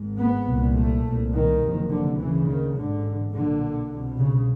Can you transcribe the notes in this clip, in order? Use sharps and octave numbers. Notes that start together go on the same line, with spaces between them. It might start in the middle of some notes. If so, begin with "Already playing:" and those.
Already playing: G#1 G#2
B3
C2 A#2
A3
C2 A#2
D#3
F#1 F2 C3
D3
D2 C#3 E3
D#3
A1 G#2 D3
B1 A#2 D3
C2 B2
C#3